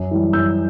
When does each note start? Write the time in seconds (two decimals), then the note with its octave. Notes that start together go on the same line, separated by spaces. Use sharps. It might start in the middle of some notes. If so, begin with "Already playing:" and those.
Already playing: F#2
0.11 E3 G3
0.33 F#2 E6 G6